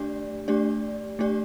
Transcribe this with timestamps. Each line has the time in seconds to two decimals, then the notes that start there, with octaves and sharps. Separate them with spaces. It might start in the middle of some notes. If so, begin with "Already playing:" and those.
Already playing: A3 D4 G4 D5
0.48 A3 D4 G4 D5
1.19 A3 D4 G4 D5